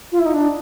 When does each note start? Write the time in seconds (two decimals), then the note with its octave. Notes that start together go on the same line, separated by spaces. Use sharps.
0.12 F4
0.19 E4
0.26 D#4
0.34 D4